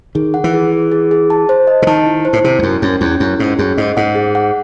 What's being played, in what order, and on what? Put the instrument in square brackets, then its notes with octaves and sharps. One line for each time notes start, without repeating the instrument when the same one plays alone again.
[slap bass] D#3 [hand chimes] G#4
[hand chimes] F#5
[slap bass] E3
[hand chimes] G#4
G#4
G#4
G#4
A5
C5
D#5
[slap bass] C#3
[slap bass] D#3 [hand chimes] A5
[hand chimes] E4
C5
[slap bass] A2
[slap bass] C3 [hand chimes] E4
[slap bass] E2
[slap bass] F#2 [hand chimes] C#4
[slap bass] F#2 [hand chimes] C#4
[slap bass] E2 [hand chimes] E4
[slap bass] F#2 [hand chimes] E4
[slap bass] G#2 [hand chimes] C#4
[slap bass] F#2 [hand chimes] G#4
[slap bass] G#2 [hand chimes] D#5
[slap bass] G#2 [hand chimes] F#5
[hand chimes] G#4
F#5